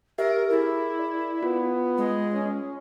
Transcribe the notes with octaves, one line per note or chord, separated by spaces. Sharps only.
G4 A#4 E5
E4 G#4 A#4
D5
B3 F4
G#3
C#4